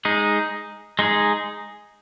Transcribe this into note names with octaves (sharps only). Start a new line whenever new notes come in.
G#3 D#4 G#4
G#3 D#4 G#4